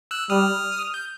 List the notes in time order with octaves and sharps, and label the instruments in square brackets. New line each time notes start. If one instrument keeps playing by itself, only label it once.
[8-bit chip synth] E6 F#6
[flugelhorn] G3 [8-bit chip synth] D#6 F6
[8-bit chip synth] G6